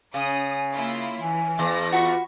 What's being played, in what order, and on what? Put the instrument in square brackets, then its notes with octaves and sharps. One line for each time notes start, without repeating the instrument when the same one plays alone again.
[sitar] C#3 [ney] G#5 [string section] D#6
[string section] A#3 E4 F4
[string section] E3 [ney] G#5
[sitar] E2 [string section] A#6
[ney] F4 [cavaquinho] F#4 B5 C#6